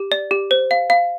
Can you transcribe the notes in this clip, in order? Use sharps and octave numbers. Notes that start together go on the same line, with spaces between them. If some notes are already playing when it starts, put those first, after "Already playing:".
Already playing: G4
D5
G4
C5
F5
F5